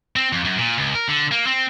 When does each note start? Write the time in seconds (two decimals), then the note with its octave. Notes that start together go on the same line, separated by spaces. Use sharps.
0.16 C4
0.33 F2
0.45 F#2
0.58 A#2
0.78 C#2
0.95 A#4
1.09 D3
1.31 A#3
1.47 C4